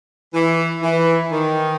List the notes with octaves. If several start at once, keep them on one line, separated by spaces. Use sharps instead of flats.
E3
E3
D#3